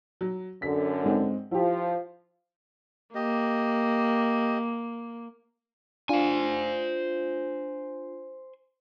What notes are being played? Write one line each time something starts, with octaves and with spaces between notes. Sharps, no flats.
F#3
F#2 D3 B6
G#2 G#3 C4
F3 E4 G4
A#3 G4 D#5
D4 F4 C5 G#5